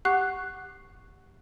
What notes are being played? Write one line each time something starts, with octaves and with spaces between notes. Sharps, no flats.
G4 F#5 C#6 F#6 C7